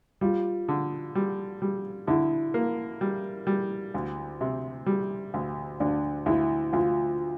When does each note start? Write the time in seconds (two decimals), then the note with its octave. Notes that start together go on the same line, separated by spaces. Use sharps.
0.21 G3 F4
0.69 D3
1.15 G3
1.62 G3
2.07 D3 E4
2.54 A#3
3.01 G3
3.47 G3
3.94 D2
4.41 C3
4.86 G3
5.34 D2
5.80 D2 D4
6.26 D2 E4
6.73 D2 F4